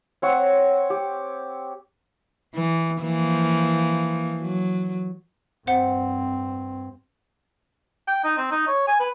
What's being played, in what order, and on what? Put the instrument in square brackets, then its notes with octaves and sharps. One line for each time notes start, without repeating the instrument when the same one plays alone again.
[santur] C4 C#5 F#5
G4
[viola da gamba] E3
E3 F3 A#3
F#3
[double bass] G2 C4 [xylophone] C5 F#5
[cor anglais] G5
D#4
C4
D#4
C#5
G#5
B4